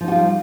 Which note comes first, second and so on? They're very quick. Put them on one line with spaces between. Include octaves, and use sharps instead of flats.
F3 D#4 F#4 F4 G3